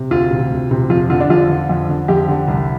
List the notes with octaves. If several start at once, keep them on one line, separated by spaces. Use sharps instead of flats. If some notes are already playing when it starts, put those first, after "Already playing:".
Already playing: C3
D2 F4
C3
D2
C3
F2 F4
D3 F4
D4
F2 F4
D3
F2
D3
F2 G4
D3
C2